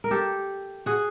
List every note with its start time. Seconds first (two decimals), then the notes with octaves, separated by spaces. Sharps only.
0.04 A#4
0.11 G4 A4
0.86 F#4 G#4